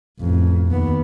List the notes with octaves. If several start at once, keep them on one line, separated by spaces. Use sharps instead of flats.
A1 F2
D#2 B3